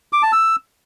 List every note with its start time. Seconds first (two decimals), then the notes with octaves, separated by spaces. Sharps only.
0.13 D6
0.23 A5
0.32 E6